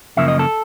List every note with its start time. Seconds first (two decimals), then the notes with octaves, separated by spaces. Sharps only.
0.17 F#2 C#3 F3 A#3 E5
0.28 D#5
0.39 A4